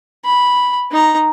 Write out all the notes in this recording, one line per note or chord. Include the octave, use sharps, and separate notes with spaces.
B5
D#4 A#5